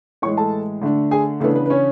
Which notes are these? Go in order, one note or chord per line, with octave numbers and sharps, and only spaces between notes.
A2 E3 G#3 C#5 C#6
A4 A5
D3 A3 D4
G#4 G#5
C#3 E3 A3 B3 D4 A4
B3 B4
B4
C#4 C#5